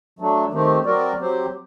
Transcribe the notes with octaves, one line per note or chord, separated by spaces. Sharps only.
F#3 A3 D4
D#3 A3 C4 G4
F#3 C4 F#4 A#4 D5
F#3 C4 G4 C5